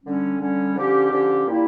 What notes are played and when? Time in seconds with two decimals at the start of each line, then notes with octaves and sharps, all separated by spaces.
0.04 D3 G3 C#4
0.40 D3 G3 C#4
0.76 D3 F3 C#4 G4
1.11 D3 F3 C#4 G4
1.47 A#2 G3 A#3 E4 G4